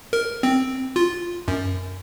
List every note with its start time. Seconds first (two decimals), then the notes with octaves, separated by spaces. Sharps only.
0.13 A#4
0.43 C4
0.96 F4
1.48 F#2